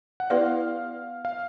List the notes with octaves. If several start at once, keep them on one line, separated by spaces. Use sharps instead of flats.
F#5
B3 E4 G4 B4 D5 F5
F5